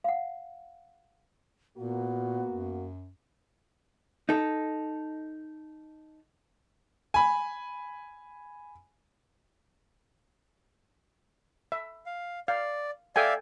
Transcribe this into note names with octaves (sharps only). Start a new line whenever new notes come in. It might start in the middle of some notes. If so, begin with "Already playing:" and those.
F5 F#5
A#2 A#3 B3 F#4
F#2
D#4 A4
G#5 B5
E5
F5
D5 F5
A4 D5 E5 F5 G5 G#5